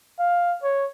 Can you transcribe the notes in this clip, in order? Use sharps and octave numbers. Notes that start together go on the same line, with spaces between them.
F5
C#5